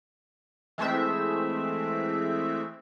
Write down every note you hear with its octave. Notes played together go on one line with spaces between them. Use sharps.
E3 G#3 A3 C4 E5